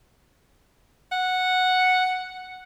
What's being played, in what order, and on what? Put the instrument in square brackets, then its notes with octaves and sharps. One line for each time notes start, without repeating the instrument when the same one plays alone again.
[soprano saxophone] F#5